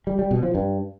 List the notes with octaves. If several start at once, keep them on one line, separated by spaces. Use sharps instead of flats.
G3
G3
B2
F3
G2